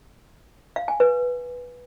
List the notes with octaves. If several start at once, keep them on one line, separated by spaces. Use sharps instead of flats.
F5
G#5
B4